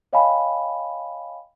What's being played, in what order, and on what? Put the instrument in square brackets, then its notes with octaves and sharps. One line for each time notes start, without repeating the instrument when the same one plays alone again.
[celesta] C#5 D#5 F5 G5 G#5 B5